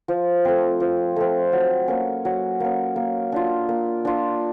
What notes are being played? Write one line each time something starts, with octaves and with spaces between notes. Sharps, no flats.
F3
A3 C4
F3
A3 C4
F#3
A#3 C#4
F#3
A#3 C#4
A#3
D4 F4
A#3
D4 F4